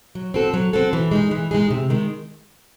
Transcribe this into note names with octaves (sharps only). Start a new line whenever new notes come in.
F#3
C4 F#4 A4
F#3
C4 F#4 A4
E3
G#3 D#4 G#4
E3
G#3 D#4 G#4
C3
D#3 G#3